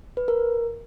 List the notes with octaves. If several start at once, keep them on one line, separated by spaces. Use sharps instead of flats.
B4
A#4